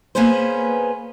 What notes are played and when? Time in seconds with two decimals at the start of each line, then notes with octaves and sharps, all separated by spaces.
0.15 A#3 B3 C#4 G#4 B4 C5